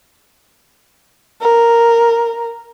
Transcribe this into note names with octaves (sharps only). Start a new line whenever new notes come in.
A#4